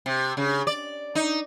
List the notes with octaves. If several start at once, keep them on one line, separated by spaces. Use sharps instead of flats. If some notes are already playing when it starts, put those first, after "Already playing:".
C3
C#3
D5
D#4